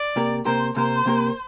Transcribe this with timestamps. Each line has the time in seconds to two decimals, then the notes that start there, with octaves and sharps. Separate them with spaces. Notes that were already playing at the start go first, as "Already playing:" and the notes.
Already playing: D5
0.16 C3 A#3 G4 A#4
0.45 C3 A#3 G4 A#4 C5
0.76 C3 A#3 G4 A#4 C5
1.06 C3 A#3 G4 A#4